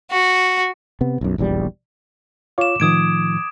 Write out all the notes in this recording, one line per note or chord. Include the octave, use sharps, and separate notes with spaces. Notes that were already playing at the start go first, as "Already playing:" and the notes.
F#4
C3 B3
B1 F#2
D#1 A#1 E2 G3
F4 C#5 F5 D6 E7
A2 D#3 F3 D#6 G#6 D7